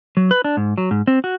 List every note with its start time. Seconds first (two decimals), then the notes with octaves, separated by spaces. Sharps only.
0.17 F#3
0.31 B4
0.44 D4
0.57 G#2
0.78 F#3
0.91 G#2
1.07 C4
1.24 F#4